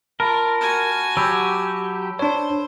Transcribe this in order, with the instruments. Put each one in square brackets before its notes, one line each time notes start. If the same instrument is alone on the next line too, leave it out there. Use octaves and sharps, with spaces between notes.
[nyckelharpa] F4 [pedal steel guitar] A#4 [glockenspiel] A5 B5 D7
[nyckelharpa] F#4 G#5
[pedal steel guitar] F#3 G4 [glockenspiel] B5 E6 D7
[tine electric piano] D4 C#5 [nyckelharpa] C5